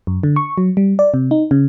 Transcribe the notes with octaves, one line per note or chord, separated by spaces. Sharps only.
F#2
D3
C#6
F#3
G3
D5
C3
D#4
C#3